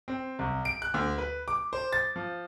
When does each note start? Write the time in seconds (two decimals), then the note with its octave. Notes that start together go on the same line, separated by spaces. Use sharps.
0.08 C4
0.39 C2
0.65 D7
0.82 F#6
0.94 D2
1.18 B4
1.48 D6
1.73 C5
1.93 A6
2.16 F3